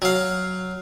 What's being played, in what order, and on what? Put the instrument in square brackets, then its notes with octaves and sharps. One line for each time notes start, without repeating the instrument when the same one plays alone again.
[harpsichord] F#3 F5